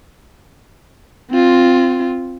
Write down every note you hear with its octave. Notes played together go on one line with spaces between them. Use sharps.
C4 F4